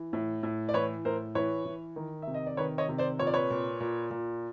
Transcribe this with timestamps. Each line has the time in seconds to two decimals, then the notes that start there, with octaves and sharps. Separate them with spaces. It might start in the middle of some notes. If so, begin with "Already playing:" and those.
Already playing: E3
0.13 A2
0.43 A2
0.69 D5
0.74 E3 B4 C#5
1.05 A2 A#4 C5
1.35 E3 B4 C#5
1.65 E3
1.96 D#3
2.22 C3 E5
2.34 D#5
2.47 D5
2.57 D#3 B4 C#5
2.78 C#5 D#5
2.89 C3
2.98 C5 D5
3.19 A#2 C#5
3.27 D5
3.34 B4 C#5
3.50 A#2
3.80 A#2
4.11 A#2